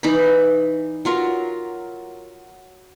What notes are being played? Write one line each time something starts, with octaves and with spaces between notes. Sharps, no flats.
E3 D#4 D5 B5
F#3 F4 A#4